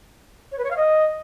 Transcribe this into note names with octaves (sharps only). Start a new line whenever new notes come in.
C#5
B4
C#5
F5
D#5